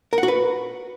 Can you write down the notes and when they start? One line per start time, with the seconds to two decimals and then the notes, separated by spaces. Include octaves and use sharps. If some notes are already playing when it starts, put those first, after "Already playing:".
0.13 A#4
0.18 F#5
0.23 F#4
0.28 B4